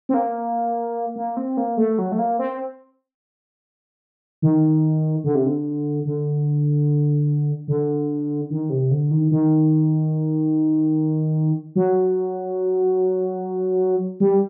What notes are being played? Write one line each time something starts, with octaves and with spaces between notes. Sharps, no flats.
C4
A#3
A#3
C4
A#3
A3
F#3
A3
A#3
C4
D#3
D3
C3
D3
D3
D3
D#3
C3
D3
D#3
D#3
F#3
G3